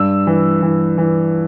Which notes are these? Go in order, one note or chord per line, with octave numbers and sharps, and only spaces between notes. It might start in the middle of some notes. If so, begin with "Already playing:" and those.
Already playing: G2 E6
E3
E3
E3